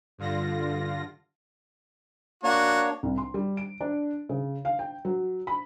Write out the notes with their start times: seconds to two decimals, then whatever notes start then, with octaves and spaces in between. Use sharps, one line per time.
0.18 G2 D3 F4 A#6
2.44 A#3 D4 F#4 C#5
3.03 C2
3.18 C6
3.34 G3
3.57 D7
3.81 D4
4.29 C#3
4.65 F5
4.79 G5
5.05 F#3
5.47 B5